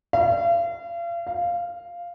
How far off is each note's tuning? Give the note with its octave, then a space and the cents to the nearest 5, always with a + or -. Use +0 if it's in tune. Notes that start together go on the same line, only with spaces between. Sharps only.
F5 -40
F5 -5